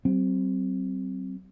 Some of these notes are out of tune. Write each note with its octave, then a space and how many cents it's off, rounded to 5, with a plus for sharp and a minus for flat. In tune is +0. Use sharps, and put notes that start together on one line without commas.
F#3 +45 C4 +0